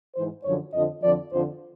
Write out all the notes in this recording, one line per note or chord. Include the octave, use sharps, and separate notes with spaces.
G#2 E3 C5
F#2 D3 F3 C#5
F2 D3 F3 D#5
F2 D3 F3 D5
F2 D3 F3 C5